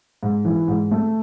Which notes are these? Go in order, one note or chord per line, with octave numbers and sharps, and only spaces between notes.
G#2
E3
G#2
A3